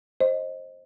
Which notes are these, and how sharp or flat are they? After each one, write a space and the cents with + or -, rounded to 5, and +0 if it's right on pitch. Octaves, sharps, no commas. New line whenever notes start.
C5 +20 D#5 +0